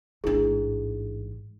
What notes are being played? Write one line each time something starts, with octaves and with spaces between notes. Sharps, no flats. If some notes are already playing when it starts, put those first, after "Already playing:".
A1 G#2 D4 E4 G#4